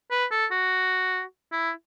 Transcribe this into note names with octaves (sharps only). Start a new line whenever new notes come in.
B4
A4
F#4
E4